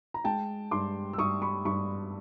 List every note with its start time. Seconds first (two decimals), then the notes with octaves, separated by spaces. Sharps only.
0.14 A#5
0.24 G#3 G5 A5
0.71 G2 C6 D6
1.13 E6
1.18 G2 C#6 D#6
1.42 B5 C#6
1.65 G2 B5 C#6